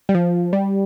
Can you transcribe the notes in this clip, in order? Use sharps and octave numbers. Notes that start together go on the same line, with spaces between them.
G3
F3
G3